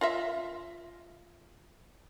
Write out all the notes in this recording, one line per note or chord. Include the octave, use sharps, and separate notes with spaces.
F4 D#5 E5